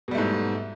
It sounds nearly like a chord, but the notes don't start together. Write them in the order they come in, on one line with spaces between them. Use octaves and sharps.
B2 G3 A3 G#2